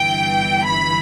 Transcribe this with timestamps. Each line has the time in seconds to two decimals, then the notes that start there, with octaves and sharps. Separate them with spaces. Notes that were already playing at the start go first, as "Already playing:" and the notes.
Already playing: G1 G2 E3 G5
0.63 B5